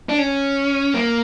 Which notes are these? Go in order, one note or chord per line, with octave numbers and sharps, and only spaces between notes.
D4
C#4
A#3